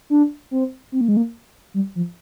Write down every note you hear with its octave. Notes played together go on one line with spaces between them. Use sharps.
D4
C4
C4
A#3
G#3
A#3
G3
F3